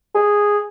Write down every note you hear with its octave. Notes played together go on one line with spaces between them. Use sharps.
G#4